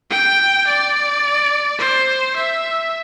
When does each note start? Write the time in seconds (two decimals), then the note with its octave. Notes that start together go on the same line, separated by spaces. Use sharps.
0.10 G5
0.67 D5
1.79 C5
2.36 E5